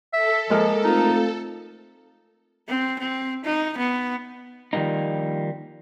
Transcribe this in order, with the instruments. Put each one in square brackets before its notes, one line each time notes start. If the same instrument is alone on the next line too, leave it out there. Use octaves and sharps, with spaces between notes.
[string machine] A4 [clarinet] E5
[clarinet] F3 [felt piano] G#3 A#3 A#4
[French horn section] A3 C4 F4 [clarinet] D#4
[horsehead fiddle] C4
C4
D#4
B3
[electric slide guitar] D#3 F3 G3 A#3 D#4